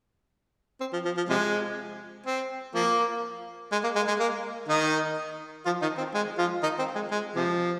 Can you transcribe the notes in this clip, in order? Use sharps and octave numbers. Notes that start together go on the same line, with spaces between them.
C4
F3
F3
F3
C3 F3 G#3
C4
F3 A#3
G#3
A#3
G#3
G#3
A#3
D#3 D#4
F3 F4
D#3 D#4
C4
G#3
F3 F4
D#3 D#4
C4
G#3
G#3
C3 F3